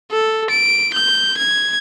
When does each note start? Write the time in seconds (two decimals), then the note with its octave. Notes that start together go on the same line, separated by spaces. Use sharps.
0.11 A4
0.50 D7
0.94 G6
1.38 G#6